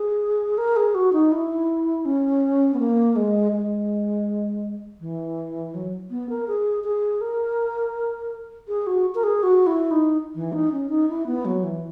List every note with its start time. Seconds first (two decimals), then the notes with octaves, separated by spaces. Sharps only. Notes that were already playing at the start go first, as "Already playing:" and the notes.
Already playing: G#4
0.58 A#4
0.76 G#4
0.95 F#4
1.13 D#4
1.32 E4
2.05 C#4
2.74 B3
2.80 A#3
3.16 G#3
3.52 G#3
5.00 E3
5.74 F#3
6.10 B3
6.30 A#4
6.48 G#4
6.84 G#4
7.21 A#4
8.68 G#4
8.87 F#4
9.15 A#4
9.23 G#4
9.43 F#4
9.67 E4
9.91 D#4
10.35 E3
10.53 D#4
10.72 C#4
10.89 D#4
11.09 E4
11.26 B3
11.45 F#3
11.63 E3